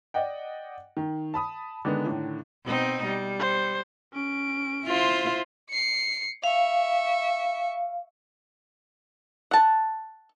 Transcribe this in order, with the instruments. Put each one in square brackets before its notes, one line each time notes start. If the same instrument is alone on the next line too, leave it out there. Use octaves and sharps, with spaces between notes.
[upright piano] D5 D#5 F#5 G5
D#3
A5 B5 D#6
D3 D#3 G#3 B3
A2 D3 D#3
[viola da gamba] B2 C4 D#4
G3
[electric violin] C5
C#4 D7
[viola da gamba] E4 F4 C5
[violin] C7 C#7
[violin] E5 C#6 [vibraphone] F5
[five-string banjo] F#5 A5